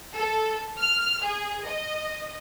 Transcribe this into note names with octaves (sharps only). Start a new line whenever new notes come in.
A4
F6
G#4
D#5